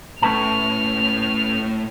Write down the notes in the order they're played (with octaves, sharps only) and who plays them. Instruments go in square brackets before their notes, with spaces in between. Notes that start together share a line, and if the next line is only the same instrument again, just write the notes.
[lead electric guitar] A2 [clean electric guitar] C#4 B4 A5 [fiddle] F6